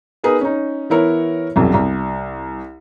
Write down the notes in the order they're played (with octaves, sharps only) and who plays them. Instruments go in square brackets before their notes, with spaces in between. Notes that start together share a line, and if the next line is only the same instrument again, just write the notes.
[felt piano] B3 D#4 G#4 A#4 B4
C#4 D#4
E3 B3 E4 A#4 C#5
E1 C2 F#2
C2